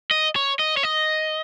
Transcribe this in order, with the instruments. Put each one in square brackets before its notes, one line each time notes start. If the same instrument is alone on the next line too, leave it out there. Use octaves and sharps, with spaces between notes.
[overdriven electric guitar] D#5
C#5
D#5
C#5
D#5